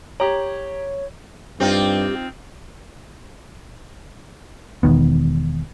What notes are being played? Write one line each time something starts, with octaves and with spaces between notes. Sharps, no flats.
G4 C#5 A#5
G2 C4 D#4 F4 G4
E1 D#2 D#3 B3